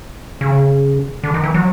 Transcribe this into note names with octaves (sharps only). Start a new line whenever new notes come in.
C#3
D3
D#3
E3
F#3